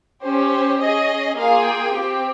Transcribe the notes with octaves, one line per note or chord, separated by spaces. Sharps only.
C#4 G4 C5
C5
C#4 G#4 D#5
A#3 F4 G#4 F5
G5
C4 G4